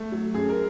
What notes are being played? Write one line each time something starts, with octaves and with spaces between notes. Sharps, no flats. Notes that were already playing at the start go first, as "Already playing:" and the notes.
Already playing: A3
F#3
F#2 G#4
A#4